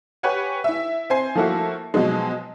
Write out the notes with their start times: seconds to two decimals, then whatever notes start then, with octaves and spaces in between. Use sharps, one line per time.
0.23 G4 B4 C#5 F#5 G#5
0.64 E4 E5
1.10 C4 C5 G#5 C7
1.35 F3 A3 A#3 E4 F#4
1.94 B2 F3 F#3 G#3